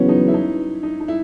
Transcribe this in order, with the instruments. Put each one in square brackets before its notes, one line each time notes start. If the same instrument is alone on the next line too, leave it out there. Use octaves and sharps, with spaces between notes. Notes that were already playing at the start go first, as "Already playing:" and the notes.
Already playing: [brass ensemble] E2 C#3 F#3 B3 [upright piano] C#4
[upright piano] D#4
E4
D#4
D#4
D#4
E4